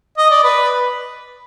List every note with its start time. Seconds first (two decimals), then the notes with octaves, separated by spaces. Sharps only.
0.18 D#5
0.30 D5
0.44 B4